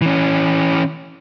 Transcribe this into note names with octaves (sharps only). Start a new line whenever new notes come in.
E3 C#4